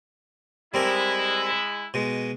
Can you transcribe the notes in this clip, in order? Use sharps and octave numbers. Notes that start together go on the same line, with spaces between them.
G3 G#3 C4 E4 A#4
B2 G#3